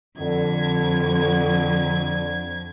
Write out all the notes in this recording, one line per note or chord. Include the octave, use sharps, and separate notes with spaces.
F2 D3 G#6